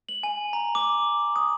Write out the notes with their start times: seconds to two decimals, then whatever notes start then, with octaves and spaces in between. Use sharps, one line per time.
0.09 F#7
0.23 G#5
0.53 A#5
0.75 D6
1.36 D#6